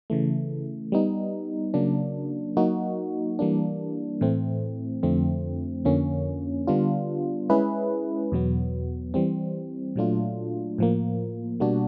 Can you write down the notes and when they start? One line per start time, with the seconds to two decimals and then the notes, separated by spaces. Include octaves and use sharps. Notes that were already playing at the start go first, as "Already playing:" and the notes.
0.10 C#3 E3 A3
0.92 G3 B3 D#4
1.74 C#3 F#3 A#3 D4
2.57 F#3 A#3 D#4 F#4
3.39 E3 G3 A#3 D4
4.21 A2 E3 A3 C4
5.03 F2 D3 F3 A3 C4
5.85 F2 D3 F3 A#3 C#4
6.67 D3 G3 B3 D4 F4
7.50 G#3 C#4 E4 G#4 B4
8.32 E2 B2 F#3 B3
9.14 E3 G3 C4
9.96 A#2 F#3 A3 D4 F4
10.78 A2 F3 A#3
11.60 B2 G3 A#3 D4 F#4